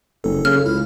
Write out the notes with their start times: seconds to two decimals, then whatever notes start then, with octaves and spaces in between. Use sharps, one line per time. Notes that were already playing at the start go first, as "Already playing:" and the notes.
0.24 F#1 A4
0.45 C#3 F6
0.66 C#2 E4